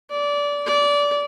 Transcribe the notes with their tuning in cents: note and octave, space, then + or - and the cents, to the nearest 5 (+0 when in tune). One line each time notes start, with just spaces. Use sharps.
D5 -20
D5 -20